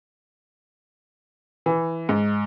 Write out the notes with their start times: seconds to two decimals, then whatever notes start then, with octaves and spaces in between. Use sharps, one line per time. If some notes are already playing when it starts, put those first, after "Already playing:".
1.66 E3
2.09 G#2